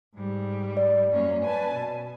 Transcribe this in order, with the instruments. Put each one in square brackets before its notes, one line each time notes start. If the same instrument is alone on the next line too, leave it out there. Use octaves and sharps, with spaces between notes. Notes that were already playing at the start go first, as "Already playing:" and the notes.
[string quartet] G#2 G3
[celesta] D5
[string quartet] F#2 A#3 C#4
B4 G#5 A5
B2